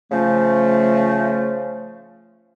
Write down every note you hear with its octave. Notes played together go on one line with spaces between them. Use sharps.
C#3 F3 A3